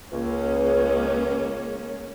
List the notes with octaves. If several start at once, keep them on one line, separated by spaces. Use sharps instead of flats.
C#2 G#3 A#3 C#4